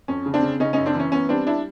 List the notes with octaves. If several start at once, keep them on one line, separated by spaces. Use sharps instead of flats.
F2 C#4
C#3
C4 D4
C#3
C#3 C#4 D#4
F#2 C#4 D#4
C4 D4
E3 C#4
B3 C#4
G3 C4 D4
D4 E4